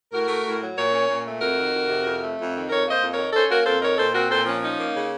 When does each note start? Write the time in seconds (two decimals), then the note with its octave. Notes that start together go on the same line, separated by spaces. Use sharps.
0.12 A2 F#4 A#4
0.28 A3
0.44 A2
0.60 F#3
0.76 A#2 A#4 C#5
0.92 C#4
1.08 A#2
1.24 A3
1.40 F2 F#4 A#4
1.56 D#3
1.73 F2
1.88 C3
2.04 F2
2.21 A3
2.37 F2
2.53 D#3
2.69 F2 A#4 C#5
2.86 A#3 C5 D#5
3.01 F2
3.12 D#3 A#4 C#5
3.33 C#4 A4 C5
3.49 A#3 F#4 A#4
3.65 F2 A4 C5
3.81 D#3 A#4 C#5
3.98 A#2 A4 C5
4.13 C4 F#4 A#4
4.30 A#2 A4 C5
4.46 F3 C#4
4.62 C#4 D#4
4.78 A#3
4.94 C#3